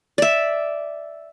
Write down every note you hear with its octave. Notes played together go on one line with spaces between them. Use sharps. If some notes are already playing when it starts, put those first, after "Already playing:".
D5 E5